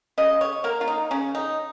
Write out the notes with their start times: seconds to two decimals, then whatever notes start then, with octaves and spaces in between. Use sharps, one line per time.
0.18 C#3 D#5
0.41 C#5
0.64 A#3 A#4
0.81 F4
0.88 D#4
1.11 C#3 C#4
1.35 D#4